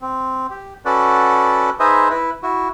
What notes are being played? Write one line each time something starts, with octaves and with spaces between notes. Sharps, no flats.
C4
G4
C#4 F#4 A4 B4 D5 F#5
D#4 G#4 B4 C5 D#5 E5
E4 B4
E4 F#4